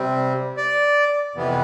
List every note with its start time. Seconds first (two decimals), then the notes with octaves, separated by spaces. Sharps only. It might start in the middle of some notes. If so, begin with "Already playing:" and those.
Already playing: C3 G3 C4
0.57 D5
1.35 F2 C3 E3 B3